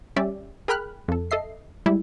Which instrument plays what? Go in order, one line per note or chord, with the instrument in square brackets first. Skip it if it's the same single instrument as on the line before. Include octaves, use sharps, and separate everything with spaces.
[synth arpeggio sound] G3 C#4 G4 D5 E5
G#4 A#4 G5 B5 F6 F#6
F2 A4
A4 D#5 E5 C7
G3 G#3 E4